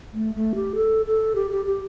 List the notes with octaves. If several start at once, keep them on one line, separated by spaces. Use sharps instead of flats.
A3
A3
G4
A4
A4
G4
G4
G4